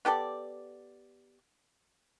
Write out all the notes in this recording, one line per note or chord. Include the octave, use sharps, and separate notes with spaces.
B3 G4 A4 D5